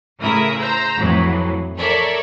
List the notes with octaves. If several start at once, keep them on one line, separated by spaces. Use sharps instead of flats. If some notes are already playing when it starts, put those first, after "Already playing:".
A2 C#3 E4 A#4 E5 D#6
C5 A#5 E6
F2 A2 E3 F#3
A4 A#4 C#5 D5 E5